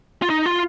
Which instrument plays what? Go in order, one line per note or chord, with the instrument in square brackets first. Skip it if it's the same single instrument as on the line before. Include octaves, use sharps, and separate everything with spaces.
[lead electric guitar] F4
D#4
F4